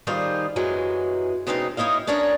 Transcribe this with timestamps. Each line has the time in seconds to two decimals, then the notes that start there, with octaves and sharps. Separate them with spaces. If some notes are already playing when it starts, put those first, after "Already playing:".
0.07 D#3 G3 D#4 F4 G#4 C5
0.56 F#2 E3 F#3 G#3
1.47 B2 G#3 C4 C#4 D#4
1.77 D#4 E4 C#5 D#5 F5
2.07 C#4 D4 A#4 C#5 G#5 A#5